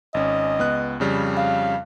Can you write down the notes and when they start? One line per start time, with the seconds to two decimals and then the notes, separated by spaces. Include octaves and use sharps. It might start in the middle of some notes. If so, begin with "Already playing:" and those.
0.14 G#1 C#4 D#5
0.59 C#2 B3 F#6
1.00 F2 C#3 G3
1.37 F5